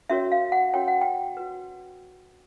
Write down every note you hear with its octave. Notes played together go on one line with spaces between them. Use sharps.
C#4 F#4 A#4 C#5 E5
F5
F#5
C#4 F#4 A#4 C#5 G5
F#5
G5
F#4 B4